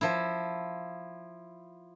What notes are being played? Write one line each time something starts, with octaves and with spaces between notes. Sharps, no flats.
F3 E4